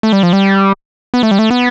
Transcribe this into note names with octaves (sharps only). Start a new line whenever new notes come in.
A3
G3
F3
G3
B3
A3
G3
A3
B3